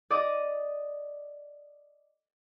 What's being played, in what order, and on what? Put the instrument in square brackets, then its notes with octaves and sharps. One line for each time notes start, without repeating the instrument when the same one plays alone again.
[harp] D5 D#5 D6 D#6